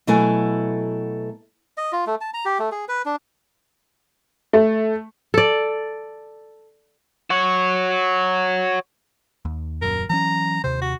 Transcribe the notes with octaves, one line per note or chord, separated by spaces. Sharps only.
B2 F#3 A3 E4 A4 G#5
D#5
F4
A3
A5
A#5
G4
A3
G#4
B4
D4
A3
A4 D5
F#4 C#5
D#2
D#1 F#2 A#4
E3 F#3 C#4 A#5
D#2 C3 C5
F#4